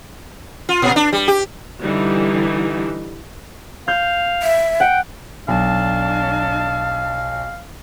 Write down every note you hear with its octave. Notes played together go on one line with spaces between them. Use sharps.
F4
A#2
D4
G3
G4
D3 E3 G3 D#4
F5 G6
E5
F#5 G5
B1 D4 F5 A5